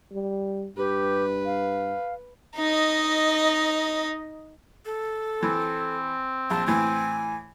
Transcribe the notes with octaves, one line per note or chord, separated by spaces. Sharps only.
G3
G2 G4 B4
F5
D#4 D#5
A4
E3 C4
A#1 A5
A2 E3 G#5